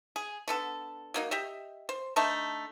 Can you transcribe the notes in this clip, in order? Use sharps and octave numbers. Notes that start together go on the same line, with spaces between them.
G#4
D3 B3 A4
F#3 A#3 D#4
G4 D#5 E5
C5
D3 A3 D#4 A5